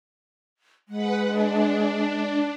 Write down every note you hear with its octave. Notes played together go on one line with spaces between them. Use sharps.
G#3 B4 F#5
D4